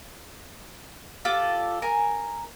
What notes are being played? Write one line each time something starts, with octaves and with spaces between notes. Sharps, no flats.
F4 G4 A4 D5
A#4 G#5